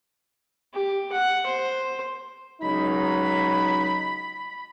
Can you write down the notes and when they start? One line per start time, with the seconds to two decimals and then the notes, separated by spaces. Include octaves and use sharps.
0.73 G4
1.12 F#5
1.46 C5
2.62 C#2 F#3 D#4 B5